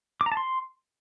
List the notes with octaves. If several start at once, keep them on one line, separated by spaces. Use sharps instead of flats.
D6
A#5
A5
C6